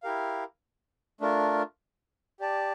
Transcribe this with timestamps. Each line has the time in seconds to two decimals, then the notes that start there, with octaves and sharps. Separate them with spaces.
0.03 E4 G4 A#4 F5
1.21 A3 D4 F4 A#4
2.40 G4 D5 A5